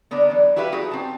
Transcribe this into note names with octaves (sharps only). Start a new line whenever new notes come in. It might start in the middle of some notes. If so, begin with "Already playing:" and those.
D3 B3 D4 A#4 D5
E3 F#3
E4 F#4 G4 B4 E5 F5
D#4 F#4 G#4
C4 A5